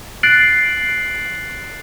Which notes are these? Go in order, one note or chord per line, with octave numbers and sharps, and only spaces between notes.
F#6 A6 C7 D7 F#7